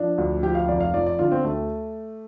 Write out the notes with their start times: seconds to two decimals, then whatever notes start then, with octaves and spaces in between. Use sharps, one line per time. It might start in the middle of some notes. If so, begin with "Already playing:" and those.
Already playing: F3 D4
0.18 D2
0.43 F3 G4
0.55 F5
0.68 F1 D5
0.80 F5
0.94 F3 D5
1.06 D5
1.19 D3 F4
1.31 C4
1.44 D2 A3